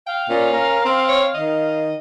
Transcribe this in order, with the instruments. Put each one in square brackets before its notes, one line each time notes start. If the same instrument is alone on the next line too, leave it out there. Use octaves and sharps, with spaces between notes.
[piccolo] F5 [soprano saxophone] G5
[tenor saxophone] A#2 [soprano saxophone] C#4
[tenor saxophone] A#4
C4
[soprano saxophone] C#5
[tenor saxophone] D#3 [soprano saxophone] D#5